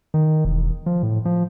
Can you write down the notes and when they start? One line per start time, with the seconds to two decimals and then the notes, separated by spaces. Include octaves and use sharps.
0.14 D#3
0.45 E1
0.86 F3
1.03 A2
1.25 F3